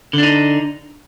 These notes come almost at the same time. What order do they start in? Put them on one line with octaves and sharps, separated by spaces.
D3 D4 D#4